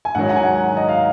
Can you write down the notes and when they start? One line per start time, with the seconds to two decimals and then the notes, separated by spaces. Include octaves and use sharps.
0.05 G#5
0.15 G#2 D#3 F#3 F#5
0.29 F#5
0.36 G#5
0.44 F#5
0.77 D#5
0.89 F5